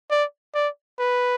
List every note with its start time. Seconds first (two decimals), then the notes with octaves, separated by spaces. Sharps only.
0.11 D5
0.55 D5
0.99 B4